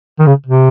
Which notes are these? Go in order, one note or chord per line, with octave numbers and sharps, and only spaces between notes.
D#3
C#3
C3